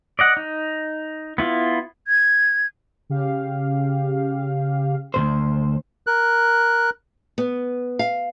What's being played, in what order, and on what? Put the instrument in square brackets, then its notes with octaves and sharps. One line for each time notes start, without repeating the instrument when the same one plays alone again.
[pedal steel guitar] D5 D#5 F#5
D#4
B3 E4 F4
[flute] G#6
[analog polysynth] C#3 G4 F5
[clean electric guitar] D2 A#2 C5
[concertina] A#4 F#6
[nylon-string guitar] B3
F5